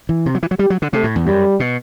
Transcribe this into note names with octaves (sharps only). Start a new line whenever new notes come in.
E3
C3
F#3
E3
F#3
G3 G4
F#3
D3
C3 A3
A2
E2
F#2 G3
B2